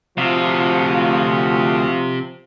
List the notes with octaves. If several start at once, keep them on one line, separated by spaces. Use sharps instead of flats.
D2 C3 F3 F4 F#4 F5 D#6